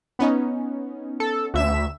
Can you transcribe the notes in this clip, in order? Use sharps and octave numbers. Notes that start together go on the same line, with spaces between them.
B3 C#4 D#4
A4
D2 E5 E7